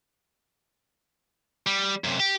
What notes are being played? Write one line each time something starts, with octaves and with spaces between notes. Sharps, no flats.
G3
F#2 C3
G4